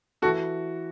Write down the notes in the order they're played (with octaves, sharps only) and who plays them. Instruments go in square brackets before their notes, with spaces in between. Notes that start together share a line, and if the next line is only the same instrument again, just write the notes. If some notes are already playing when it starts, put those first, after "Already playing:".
[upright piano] E3 F#4 A4